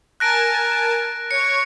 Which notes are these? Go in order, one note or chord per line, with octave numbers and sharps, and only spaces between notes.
A#4 G#5 A5 F#6 A#6 D7
C#5 C#6 C#7